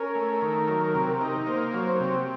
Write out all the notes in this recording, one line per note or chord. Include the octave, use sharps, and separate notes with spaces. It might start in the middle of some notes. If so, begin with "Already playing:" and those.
Already playing: C#4 A#4
A3
D#3
F#3
C3
D#4
A#3 C5
F#3
C5
C3